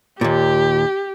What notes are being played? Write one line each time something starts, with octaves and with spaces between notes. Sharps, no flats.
D#2 A#2 G4